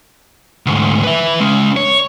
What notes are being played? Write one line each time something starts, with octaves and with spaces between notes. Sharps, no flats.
D2 G#2
B4 E5
G#3 C#4
C#5